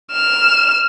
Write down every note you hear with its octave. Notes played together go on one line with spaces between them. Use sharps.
F6 E7